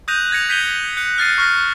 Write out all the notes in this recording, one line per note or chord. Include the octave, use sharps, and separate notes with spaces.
D#6 F#6 G6 A#6 D#7 F7
G#6 A#6 C#7 F7
G6 B6 D#7 G7
F#6 C#7
F6 A6 C7 D#7
C#6 F6 A#6